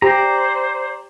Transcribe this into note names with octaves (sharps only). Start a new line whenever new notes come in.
G4 C5 D5 A#5